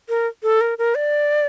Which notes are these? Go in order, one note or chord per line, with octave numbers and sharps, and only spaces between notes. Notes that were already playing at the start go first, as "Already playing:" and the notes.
A#4
A4
A#4
A#4
D5